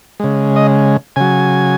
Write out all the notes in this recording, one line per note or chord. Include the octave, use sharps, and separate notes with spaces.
C#3 G#3
D#5
C#3 F#3 G#5